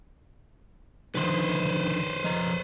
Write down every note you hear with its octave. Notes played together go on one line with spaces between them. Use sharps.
D3 D#3 F3 B4 C5
F3 D#5 A#5